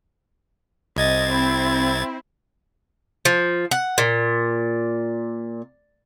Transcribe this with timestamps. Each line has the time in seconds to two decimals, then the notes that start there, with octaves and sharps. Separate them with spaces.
0.96 C2 C4 D#5 G#6 A6
1.32 E4
3.25 F3
3.71 F#5
3.98 A#2